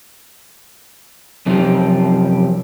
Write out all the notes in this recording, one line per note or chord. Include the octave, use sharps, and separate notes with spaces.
F#2 C3 F3 A#3 F4 G4